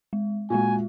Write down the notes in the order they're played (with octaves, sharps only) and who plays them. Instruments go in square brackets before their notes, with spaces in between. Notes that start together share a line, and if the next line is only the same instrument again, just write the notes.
[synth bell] G#3
[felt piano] A#2 F#4 [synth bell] G#3 F4 [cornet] G#5